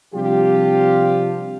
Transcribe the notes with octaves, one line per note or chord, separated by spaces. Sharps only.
C3 F3 G3 D4 F4 G4